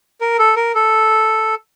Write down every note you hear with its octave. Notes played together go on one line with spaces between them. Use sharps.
A#4
A4
A#4
A4